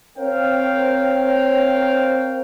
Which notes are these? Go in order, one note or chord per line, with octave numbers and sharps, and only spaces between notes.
C4 A#4 C5 C#5 F5 G5